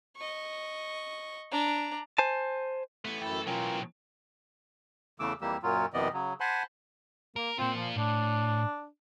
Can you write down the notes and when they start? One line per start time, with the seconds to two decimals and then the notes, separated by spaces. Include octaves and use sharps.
0.17 D#5 C#6
1.51 D4 A#5
2.18 C5 G#5 A5
3.05 E3 A3 B3
3.22 F#2 E4 A4 G5
3.47 B2 E3 F#3 C#4 F4 A#4 G5 G#5
5.20 E2 C#3 E3 A3 D6 E6
5.41 F2 E3 G3 A#3 G4 E6
5.63 F#2 A#2 F#3 F4
5.94 F#2 C3 E3 B3 D5 D#5
6.13 C#3 F#3
6.40 C5 F#5 G#5 A5 B5 C6
7.36 A#3 A#4
7.58 A#3 C4 F4
7.76 F3
7.96 A2 D4